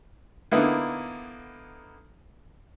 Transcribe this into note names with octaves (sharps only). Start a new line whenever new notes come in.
D3 A#3 B3 D#4 E4